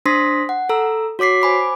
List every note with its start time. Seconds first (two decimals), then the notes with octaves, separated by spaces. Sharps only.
0.06 D4 C5 C6 D#6 A#6 B6
0.49 F#5
0.69 A4 A#5 E6
1.19 F#4 C#5 D6 B6 C7
1.42 C5 G#5 B5 D6